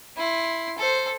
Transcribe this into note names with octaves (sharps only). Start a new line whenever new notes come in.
E4 C6
A4 C5